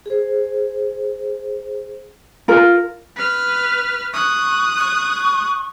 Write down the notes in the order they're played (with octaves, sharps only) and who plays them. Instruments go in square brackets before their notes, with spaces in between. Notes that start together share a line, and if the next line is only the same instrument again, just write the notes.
[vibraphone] G#4 C5
[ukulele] F4 A#4
[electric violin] B4 F6
[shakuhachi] C#6 [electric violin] D#6 F#6
[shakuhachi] C#6